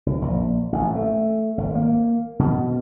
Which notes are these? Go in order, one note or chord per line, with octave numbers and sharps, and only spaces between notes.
C2
A#1
A1
A3
G#1
A#3
B2